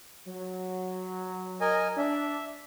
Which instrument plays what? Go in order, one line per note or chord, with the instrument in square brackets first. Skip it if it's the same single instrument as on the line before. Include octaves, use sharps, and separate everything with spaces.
[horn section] F#3
[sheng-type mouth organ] A#4 D#5 G#5
[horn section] D4 [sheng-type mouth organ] E5